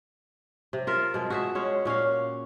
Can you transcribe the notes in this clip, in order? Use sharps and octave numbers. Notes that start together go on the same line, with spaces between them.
C3
F4 A#4 E5
B2 G#3
F#4 G#4 E5
G#3 C#4 C#5
A#2 C#4 F#4 F5